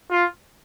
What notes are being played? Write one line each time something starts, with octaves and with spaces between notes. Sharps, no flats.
F4